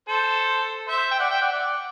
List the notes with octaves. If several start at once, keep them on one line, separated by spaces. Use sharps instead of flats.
A4 C5
C5 E5
G5
D5 F#5
E5 G5
D5 F#5
D5 F#5